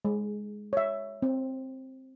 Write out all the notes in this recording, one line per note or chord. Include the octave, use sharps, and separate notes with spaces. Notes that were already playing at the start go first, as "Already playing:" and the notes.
G#3
C#5 E5
C4